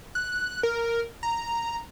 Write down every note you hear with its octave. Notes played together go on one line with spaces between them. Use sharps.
F#6
A#4
A#5